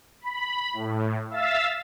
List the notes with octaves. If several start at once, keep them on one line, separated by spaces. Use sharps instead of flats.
B5
A2
E5 F5 E6 A6